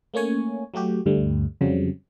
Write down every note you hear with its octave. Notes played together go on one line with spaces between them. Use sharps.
A3 A#3 C#4 C#5 G#5
F#3 A3 F#4 G4
D2 G2 G3 A3
F2 C#3 F#3 G3 C4